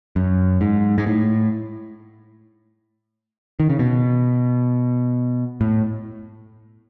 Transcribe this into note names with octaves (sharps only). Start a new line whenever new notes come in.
F#2
G#2
G#2
A2
D#3
C#3
B2
A2